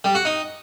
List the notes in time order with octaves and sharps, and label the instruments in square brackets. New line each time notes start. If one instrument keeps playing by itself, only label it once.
[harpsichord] G3
F#4
D#4